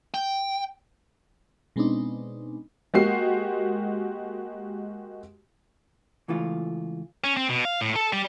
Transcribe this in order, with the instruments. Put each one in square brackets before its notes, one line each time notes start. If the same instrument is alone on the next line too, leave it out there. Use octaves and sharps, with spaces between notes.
[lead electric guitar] G5
[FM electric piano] B2 G#3 B3 C4 D4 D#4
[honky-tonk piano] G#3 A#3 F#4 G4 C7
[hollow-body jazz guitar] C#2 E3 A3 F4
[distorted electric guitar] C#4
C4
B2
F5
A2
A4
G3